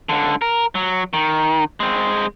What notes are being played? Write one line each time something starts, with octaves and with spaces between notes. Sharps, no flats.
C#2 D3
A#4
F#3
D#3
G#3 C4